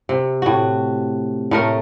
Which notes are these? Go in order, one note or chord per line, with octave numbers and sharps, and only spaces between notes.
C3
A2 F#4
A2 A3 A#4